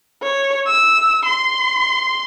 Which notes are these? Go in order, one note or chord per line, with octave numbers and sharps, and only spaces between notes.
C#5
E6
C6